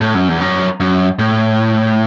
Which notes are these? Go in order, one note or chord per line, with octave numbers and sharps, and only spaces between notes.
A2
F#2
E2
F#2
F#2
A2